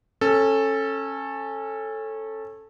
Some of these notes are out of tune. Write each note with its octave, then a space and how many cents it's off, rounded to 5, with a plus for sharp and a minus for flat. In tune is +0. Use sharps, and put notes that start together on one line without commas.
C#4 -20 A4 +0